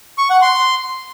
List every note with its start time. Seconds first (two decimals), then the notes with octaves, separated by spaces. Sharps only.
0.18 C#6
0.30 F#5
0.42 C6